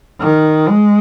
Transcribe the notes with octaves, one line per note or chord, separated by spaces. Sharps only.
D#3
G#3